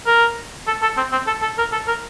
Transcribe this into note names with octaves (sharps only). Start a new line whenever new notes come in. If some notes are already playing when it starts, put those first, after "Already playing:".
A#4
A4
A4
C4
C4
A4
A4
A#4
A4
A#4